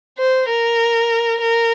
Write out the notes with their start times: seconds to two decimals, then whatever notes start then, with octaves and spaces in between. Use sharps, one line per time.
0.18 C5
0.49 A#4
1.41 A#4